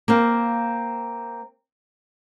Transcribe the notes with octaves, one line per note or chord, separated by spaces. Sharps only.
A#3 C4 F5